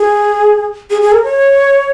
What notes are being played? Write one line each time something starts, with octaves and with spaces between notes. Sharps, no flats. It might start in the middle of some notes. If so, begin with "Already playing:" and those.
Already playing: G#4
G#4
G#4
A#4
C#5